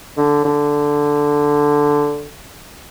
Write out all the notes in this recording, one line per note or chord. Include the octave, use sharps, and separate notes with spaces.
D3
D3